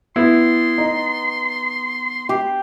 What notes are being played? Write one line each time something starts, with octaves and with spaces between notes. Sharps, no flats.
B3 E4 C6
D#4
G4